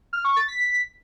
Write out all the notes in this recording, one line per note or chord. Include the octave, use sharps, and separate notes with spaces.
F6
C#6
A6
B6